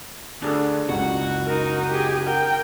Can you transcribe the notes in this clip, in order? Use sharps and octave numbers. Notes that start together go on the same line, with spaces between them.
D2 D4 G#4 A4
F#1 C#2 F#4
D#4 A#4
G4 G#4
A#4 G5